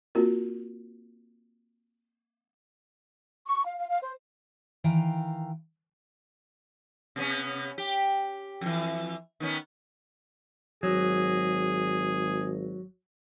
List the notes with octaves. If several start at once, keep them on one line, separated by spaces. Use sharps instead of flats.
A#3 C4 F4 F#4 A#4
C#6
F5
F5
F5
C5
D#3 E3 F5 G5 A#5
C3 B3 C#4
G4
F2 E3
D#3 B3 C#4
G#1 F#3 G#4